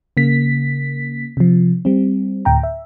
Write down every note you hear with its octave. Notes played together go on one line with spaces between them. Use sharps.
C#3 A#3 B6
C3 F3
G3 C4
D2 A2 G5 A#5
E5